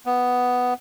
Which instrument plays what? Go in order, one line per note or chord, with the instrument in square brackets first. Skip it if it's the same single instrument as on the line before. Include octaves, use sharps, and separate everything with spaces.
[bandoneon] B3